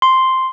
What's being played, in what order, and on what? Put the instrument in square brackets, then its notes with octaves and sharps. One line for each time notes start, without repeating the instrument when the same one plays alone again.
[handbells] C6